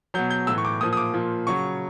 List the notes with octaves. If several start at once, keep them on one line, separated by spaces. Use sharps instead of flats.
B2 F#3 G6
G6
A2 E3 E6
C#6
D6
A#2 F3 D#6
D#6
D6
A#2 F3
C#3 F#3 C#6